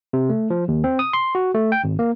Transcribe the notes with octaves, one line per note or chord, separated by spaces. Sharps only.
C3
A3
F3
D#2
C4
D#6
C6
F#4
A3
G5
G#1
A#3